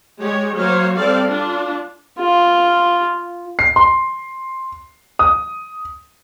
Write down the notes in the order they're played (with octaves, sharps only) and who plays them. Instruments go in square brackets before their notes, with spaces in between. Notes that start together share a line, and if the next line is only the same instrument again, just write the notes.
[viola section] G#3 G4 C#5
F#3 A#3 C5 C#5 F5
G3 C4 A4 D5 F5
D4 F4
[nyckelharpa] F4
[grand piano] C7
C6
D#6